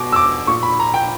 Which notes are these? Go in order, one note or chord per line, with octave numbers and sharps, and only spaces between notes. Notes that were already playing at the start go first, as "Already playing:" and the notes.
Already playing: B2 D6
E6
D6
A#2 C#6
B5
A#5
G5